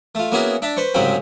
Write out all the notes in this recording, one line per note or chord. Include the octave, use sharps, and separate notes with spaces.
A3 F4
A#3 B3 C#4 E4 F#4 G#4
D4 E5 A5
B4 C5 C#6
C2 G#2 C#3 F#3 C4 B5